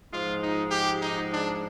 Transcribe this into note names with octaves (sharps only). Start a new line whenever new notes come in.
G#2 F3 G#3 F4
D#4
G4
D#4
D4